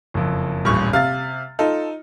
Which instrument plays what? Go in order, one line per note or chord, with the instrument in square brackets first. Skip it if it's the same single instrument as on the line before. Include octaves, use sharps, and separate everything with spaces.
[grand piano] F#1 F2
[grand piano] D#1 A1 [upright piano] G2 C#6
[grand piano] C3 A6 [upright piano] F5
[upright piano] D#4 [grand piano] F4 A4